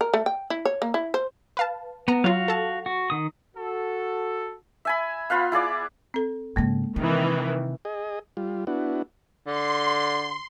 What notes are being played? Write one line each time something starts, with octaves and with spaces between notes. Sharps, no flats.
A#4
A3
G5
E4
C#5
A#3
E4
C5
B4 F5 A5
B3 F#5 A#5
F#3 F4 F#4 F5
A4 A5
F#4
D#3 D#6
F#4 A4
E5 G#5 B5
B3 F4 B4 F5
E4 G#4 D5 D6
C4 A4
G#2 C#3 G#3 A#3
C3 D#3 E3
G#4 D#5
G3 F4
B3 D4 E4 F#4
D3 C6